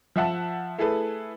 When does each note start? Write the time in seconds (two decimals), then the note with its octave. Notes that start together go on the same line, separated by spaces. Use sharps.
0.16 F3 E5 F#5 A5
0.78 A3 E4 G#4 A4 B4